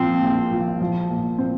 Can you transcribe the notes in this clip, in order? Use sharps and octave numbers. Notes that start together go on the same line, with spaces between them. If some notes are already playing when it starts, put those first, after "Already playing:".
Already playing: A#2 F3 C4
A#1
F3
F3
A#2
C4